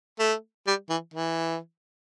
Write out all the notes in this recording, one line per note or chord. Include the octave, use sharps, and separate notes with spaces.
A3
G3
E3
E3